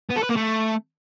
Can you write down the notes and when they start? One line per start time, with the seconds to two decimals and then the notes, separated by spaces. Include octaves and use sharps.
0.10 B3
0.16 A4
0.23 B4
0.29 A#3
0.36 A3